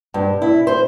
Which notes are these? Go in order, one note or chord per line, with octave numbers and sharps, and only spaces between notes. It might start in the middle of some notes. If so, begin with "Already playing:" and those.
G2
E4
C5